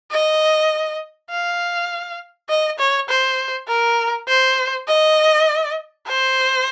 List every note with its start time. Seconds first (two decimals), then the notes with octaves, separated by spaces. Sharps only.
0.11 D#5
1.31 F5
2.49 D#5
2.79 C#5
3.09 C5
3.68 A#4
4.28 C5
4.88 D#5
6.07 C5